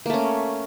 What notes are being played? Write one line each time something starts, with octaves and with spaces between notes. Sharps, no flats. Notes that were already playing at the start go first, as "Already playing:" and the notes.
A3 A#3 C#4